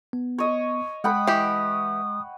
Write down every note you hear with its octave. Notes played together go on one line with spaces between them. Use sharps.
B3
C#5 D#5
G#3 D#5 F#5 G5 B5 D#6
E3 G4